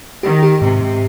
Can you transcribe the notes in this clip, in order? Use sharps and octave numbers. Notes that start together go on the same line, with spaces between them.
D#3 G4
G4
G#2 C3
G#2